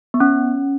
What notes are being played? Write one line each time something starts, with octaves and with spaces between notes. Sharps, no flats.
B3
C#4